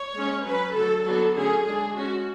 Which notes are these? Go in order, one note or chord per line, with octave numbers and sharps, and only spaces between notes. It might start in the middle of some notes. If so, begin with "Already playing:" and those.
Already playing: C#5
G#3 C#4
F#3 C#4 B4
D3 F#3 A3 A4
D3 F#3 B3 D4 A4
D3 A3 C#4 G#4
G#3 D4 G#4
G#3 C#4 F#4